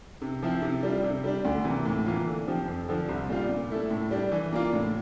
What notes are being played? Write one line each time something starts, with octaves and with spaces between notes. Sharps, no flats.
C3
F3 C4 E4
C3
G3 D4 F4
C3
G3 D4
D2
C3 E3 A#3
A2
E3 A#3 F4
D3
F3 C4 G4
F2
D3 F3
C2
A#2 G3 D4 F4
A#2
A3 E4 A4
A2
G3 D4
E3
A#3 D4 F4
A2